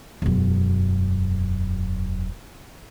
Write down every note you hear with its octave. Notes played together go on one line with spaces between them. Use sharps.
E1 F#2